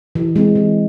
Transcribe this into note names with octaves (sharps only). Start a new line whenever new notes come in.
E3
G#3 C4
E3